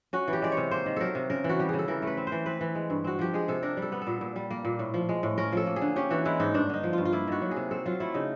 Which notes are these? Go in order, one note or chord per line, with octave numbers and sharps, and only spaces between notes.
C#4 F#4
E3
G4
G#3 D5
C#5
C3
A#3 C5
D#3
F#3 A4 A#4
C3
C#3 A#4
E3
F#4
G3 G4
C#3 G#4
A4
E3 A#4
A3 B4
C4
C5
E3
C4 B4
E3
G#3
G2
C4 F#4
F3 G4
G#3 G#4
C3 A4
D4 A#4
G3
A4
B3
A4
A#2
A#2
G3
A#3
A#2
A2
F3
G#3
A2
C#4 A#4
F3 A4
A#3
G#4
D3
C#4 G4
E3 F#4
G#3 E4
G#2 D#4
G2 D4
D3 D#4
F3
G2 F4
F4
A#3 E4
D#3 F#4
F#3
G#4
C3
C4 A4
F#3 F4
A3 E4
C#3 D#4